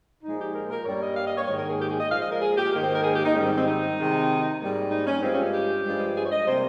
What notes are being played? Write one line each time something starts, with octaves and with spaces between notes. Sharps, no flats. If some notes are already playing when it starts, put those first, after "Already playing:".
A#2 F3 G#3 D#4
G4
A#4
A#4
G2 G3 A#3 C#5
D#5
F5
D#5
C#5
G#2 D#3 A#3 C#5
A#4
G#4
G4
G#4
D#5
A#2 F3 G#3 F5
D#5
A#4
G#4
G4
G#2 D#3 A#3 A#4
C5
A#4
G#4
G4
D#4
G#2 D#3 G3 C#4
C4
C4
D#4
C3 D#3 G#3
G#2 G3 A#3
D#4
C#4
G2 F3 G#3 C4
C#4
G4
G2 F3 G#3
G#4
C#5
D#5
C3 G3 A#3 C5